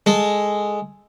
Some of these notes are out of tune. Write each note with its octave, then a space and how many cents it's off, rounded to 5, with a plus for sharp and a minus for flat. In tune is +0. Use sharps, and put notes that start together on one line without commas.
G#3 +0 A4 -5